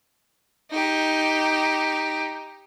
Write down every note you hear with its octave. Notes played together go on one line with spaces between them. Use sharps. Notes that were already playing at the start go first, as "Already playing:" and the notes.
D#4 G4